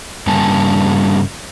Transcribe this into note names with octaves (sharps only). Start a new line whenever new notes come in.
G2 C#3 G3 A#3 G#5 A5